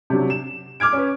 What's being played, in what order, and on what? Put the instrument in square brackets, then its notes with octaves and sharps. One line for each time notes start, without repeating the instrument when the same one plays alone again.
[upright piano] C3 F#3 D4
E7
D6 F6 G#6 D7
C#4 B4